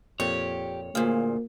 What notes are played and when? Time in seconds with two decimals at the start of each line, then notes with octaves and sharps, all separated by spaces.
0.20 F2 A#2 G4 C#5
0.95 D2 A#2 A#3 G#4 F5